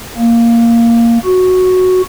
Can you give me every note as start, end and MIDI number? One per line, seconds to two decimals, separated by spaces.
0.18 1.18 58
1.25 2.02 66